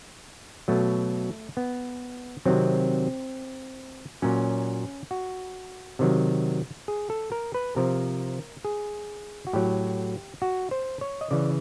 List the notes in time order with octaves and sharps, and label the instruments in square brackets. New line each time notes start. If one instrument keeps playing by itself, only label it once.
[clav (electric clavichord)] B2 F#3 A3
B3
C3 D#3 F#3 C4
A#2 F#3 C#4
F#4
C3 D#3 F#3
G#4
A4
A#4
B4
C3 F3 A#4
G#4
F#4
A2 F#3 G4
F#4
C5
C#5
D#5
C#3 E3 D5